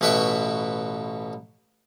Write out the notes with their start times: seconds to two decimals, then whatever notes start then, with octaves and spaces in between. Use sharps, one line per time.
0.01 A1 B2 B4 E5 G5 C#6